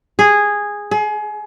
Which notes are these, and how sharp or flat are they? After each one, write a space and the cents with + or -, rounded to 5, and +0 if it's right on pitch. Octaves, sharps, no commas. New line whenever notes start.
G#4 -10
G#4 +30